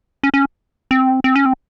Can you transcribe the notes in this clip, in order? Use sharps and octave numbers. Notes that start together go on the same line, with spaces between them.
C#4
C#4
C4
C4
C#4
C4